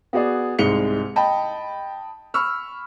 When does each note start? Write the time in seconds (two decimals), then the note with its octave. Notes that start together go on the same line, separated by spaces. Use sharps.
0.13 B3 F#4 G#4 D5
0.59 C2 G#2 G#3 C#7 F7 G7
1.16 D#5 G5 A5 B5
2.34 B5 C#6 E6 F6